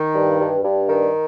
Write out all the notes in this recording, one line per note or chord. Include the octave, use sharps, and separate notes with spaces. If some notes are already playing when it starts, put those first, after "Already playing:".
Already playing: D#3
G2
G2
G2
D#3